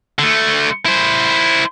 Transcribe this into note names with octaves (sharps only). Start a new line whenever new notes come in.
D3 A3
E4 C5